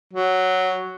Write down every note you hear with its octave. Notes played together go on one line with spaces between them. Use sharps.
F#3